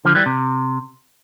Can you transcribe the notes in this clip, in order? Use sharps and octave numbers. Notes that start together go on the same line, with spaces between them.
D3 F3
E3 G3
C3